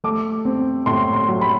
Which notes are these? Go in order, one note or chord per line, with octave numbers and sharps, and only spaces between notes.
A3 D6
C4
A2 C6
C6
F#3
B5